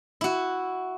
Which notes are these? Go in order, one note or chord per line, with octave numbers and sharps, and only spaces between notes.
E4 F#4